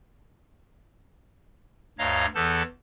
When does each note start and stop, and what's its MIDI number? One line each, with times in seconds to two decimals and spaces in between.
1.99 2.26 38
1.99 2.26 43
1.99 2.26 73
1.99 2.26 75
1.99 2.26 77
1.99 2.26 82
2.35 2.63 40
2.35 2.63 52
2.35 2.63 59
2.35 2.63 69
2.35 2.63 81
2.35 2.63 91